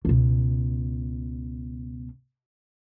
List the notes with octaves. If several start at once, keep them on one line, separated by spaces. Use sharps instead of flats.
C#2 B2